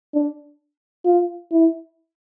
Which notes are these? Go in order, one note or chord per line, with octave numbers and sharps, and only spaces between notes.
D4
F4
E4